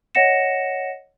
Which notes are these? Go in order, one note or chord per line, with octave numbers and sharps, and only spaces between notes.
C#5 D#5 F#5 A#6 C#7 E7